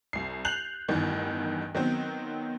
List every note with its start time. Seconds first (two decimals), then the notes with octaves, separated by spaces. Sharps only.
0.13 C2 C7
0.45 F#6 G6 C7 F7 F#7
0.88 A1 E2 G2 D#3 E3
1.75 D#3 F#3 B3 C4